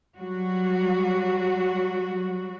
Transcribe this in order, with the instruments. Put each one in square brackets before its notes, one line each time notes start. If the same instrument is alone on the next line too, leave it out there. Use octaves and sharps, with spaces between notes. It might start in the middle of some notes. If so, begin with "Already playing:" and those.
[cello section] F#3 G3 F#4